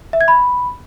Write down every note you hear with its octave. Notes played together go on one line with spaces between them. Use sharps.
E5
G#6
B5